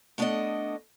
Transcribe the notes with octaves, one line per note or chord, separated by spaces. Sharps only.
A3 B3 D4 E4 A4 D#5